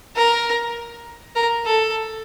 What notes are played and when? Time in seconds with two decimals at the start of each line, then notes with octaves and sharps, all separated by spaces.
0.16 A#4
1.36 A#4
1.65 A4